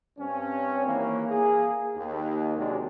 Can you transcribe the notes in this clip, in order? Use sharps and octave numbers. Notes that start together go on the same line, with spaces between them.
G2 C4 C#4
D#2 E3 A#3
A#3 G#4
D#2
C3 D#3 F#3 G#3 D4